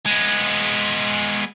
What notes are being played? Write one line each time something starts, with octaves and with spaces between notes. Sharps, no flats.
G#3 B3